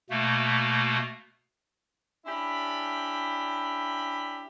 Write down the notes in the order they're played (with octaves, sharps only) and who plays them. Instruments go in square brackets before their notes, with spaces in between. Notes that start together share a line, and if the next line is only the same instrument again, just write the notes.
[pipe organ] B2 A3 A#3
[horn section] C#4 D4 E4 G4 B5